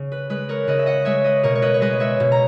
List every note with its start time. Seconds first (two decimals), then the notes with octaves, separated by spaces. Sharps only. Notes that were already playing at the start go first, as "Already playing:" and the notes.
Already playing: C#3
0.12 B4
0.30 G#3 B4
0.49 A#4 C#5
0.67 C#3 B4 D#5
0.79 E5
0.86 D#5 F#5
1.05 G#3 C#5 E5
1.24 B4 D#5
1.43 B2 A#4 C#5
1.55 C#5
1.62 B4 D#5
1.74 C#5
1.81 G#3 B4 D#5
2.00 C#5 E5
2.20 B2
2.32 A#5